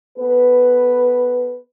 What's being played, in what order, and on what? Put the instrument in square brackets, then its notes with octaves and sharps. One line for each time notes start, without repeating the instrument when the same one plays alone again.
[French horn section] B3 A4 B4